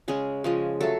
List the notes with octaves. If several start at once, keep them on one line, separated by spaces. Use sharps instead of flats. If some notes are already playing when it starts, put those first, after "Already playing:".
C#3 G#3 C#4 G#4
C#3 F3 G#3
F#3 A3 A4